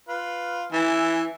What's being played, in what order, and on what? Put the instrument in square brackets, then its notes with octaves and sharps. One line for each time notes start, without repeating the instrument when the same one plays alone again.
[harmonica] F4 B4
[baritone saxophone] E3 [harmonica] E5 G#5